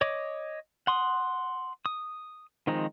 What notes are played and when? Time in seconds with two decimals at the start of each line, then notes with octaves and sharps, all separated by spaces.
0.01 C#5 D#5 D6
0.87 F#5 C6 D#6
1.86 D#6
2.67 D#3 F3 G#3 C4 D#4